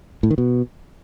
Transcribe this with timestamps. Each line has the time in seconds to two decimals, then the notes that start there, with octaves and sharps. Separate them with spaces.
0.23 A2
0.31 D#3
0.38 B2